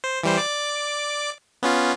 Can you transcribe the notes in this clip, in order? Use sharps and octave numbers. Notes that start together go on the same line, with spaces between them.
C5
E3 G3 C5
D5 D6
B3 C#4 F4